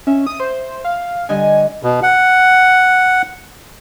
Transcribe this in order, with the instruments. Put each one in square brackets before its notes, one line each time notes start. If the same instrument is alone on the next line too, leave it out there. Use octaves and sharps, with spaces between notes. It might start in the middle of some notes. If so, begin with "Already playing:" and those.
[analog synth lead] C#4 [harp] E5
[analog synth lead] D#6
C5
F5
[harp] D3 G3 D#5 [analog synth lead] G#5
[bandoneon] B2
F#5